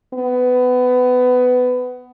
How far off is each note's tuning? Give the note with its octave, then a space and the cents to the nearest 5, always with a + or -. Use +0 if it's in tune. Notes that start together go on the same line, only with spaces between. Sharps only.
B3 +20